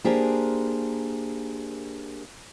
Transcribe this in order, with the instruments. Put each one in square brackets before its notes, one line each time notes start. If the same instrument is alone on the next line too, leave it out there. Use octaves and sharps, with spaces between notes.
[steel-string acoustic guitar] A#3 D4 G4 G#4 A#4 C5